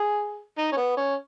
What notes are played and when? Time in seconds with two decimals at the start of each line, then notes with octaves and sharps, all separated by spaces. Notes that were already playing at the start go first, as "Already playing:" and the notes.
Already playing: G#4
0.58 D#4
0.72 C#4
0.77 B3
0.97 C#4